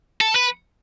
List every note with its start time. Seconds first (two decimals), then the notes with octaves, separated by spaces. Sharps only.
0.21 A4
0.36 B4